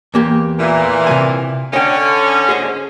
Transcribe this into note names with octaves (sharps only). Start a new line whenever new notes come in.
E2 A#3 G4
A#2 E3
C3 F3 G#5
D3 C#4 D#5 G5
G#4 C5 D#5